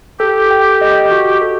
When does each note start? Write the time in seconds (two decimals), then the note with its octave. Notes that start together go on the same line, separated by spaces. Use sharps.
0.19 G4 A4
0.51 G5
0.81 D#5
1.11 F#4
1.42 A4